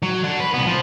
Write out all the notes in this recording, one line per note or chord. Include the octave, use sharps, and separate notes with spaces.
F#3
D4 F#5
B4
C2 B3
F3